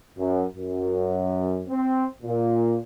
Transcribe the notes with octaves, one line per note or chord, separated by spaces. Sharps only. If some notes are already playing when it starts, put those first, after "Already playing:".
F#2
F#2
C4
A#2